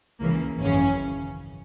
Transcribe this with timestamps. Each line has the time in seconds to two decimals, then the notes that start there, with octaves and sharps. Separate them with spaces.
0.21 C#2 C#3 E3 A#3
0.60 G#1 F#2 C#3 E3 C#4